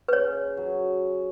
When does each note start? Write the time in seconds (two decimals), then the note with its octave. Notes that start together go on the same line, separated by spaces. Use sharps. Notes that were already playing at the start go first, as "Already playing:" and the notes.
0.08 B4
0.13 C#3 C#5
0.57 F#3